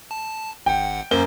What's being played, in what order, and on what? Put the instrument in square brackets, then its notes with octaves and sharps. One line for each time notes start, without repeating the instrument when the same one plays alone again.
[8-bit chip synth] A5
[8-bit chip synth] G#1 F#5 [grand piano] G5
[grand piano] F#2 A#4 G7 [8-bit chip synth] A#3 C#4 C5